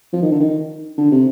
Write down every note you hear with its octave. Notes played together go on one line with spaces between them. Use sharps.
F3
D#3
D3
D#3
D3
C3